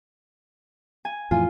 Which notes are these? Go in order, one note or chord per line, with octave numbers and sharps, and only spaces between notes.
G#5
F2 A2 E3 F4 G#5